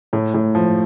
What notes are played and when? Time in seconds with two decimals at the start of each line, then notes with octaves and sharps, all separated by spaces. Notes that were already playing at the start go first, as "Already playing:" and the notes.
0.13 A2
0.34 A2
0.55 F3